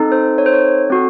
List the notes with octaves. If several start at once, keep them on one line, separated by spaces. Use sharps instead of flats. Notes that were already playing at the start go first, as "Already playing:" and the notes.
Already playing: C4 D#4 A4
C5
C#5
C5
C#5
C4 F#4 A4